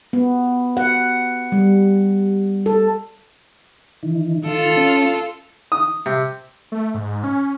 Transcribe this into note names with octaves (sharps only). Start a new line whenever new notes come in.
B3
F#5
G3
A4
D#3 E3
D#3 F4 A4
C#4
D#6
C3
A3
G#2
C#4